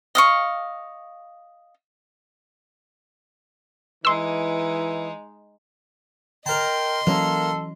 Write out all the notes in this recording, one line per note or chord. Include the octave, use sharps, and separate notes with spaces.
D#5 F5 C#6
E3 G#3 D#4 C6 E6
A#4 D#5 G5 A5 C6
E3 F#3 A#3 C#4 A4